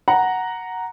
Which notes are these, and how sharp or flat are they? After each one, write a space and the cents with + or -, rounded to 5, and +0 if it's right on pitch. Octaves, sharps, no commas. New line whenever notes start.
F#5 +0 A#5 +0